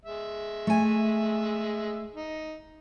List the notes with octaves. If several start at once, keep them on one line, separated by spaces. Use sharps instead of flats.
G#3 E5
A3 G#5
D#4